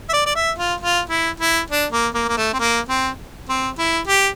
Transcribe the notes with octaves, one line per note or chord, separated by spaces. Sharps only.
E5
D5
D5
E5
F4
F4
E4
E4
D4
A#3
A#3
A#3
A3
C4
A#3
C4
C4
E4
G4